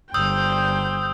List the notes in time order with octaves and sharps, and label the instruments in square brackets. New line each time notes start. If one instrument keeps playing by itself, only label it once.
[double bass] G1 [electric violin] C5 G5 [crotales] D#6 E6 G6